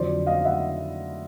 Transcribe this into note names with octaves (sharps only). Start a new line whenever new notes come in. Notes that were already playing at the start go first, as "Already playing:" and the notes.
Already playing: F2 D3 F#3 C5 D5
D#5 F5
E5 F#5